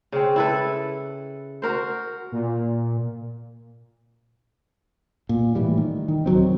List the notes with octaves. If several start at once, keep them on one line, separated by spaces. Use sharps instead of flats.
C#3 C4
E4 A4 B4
F#4 A#4 C5
A#2
A#2
A2 E3 G3
D#3
D#3
D1 D#3 F#3 C4